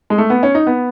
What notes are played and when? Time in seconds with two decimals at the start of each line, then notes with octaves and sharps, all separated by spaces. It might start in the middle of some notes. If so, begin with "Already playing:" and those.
0.10 G#3
0.18 A3
0.30 B3
0.43 C#4
0.55 D#4
0.67 B3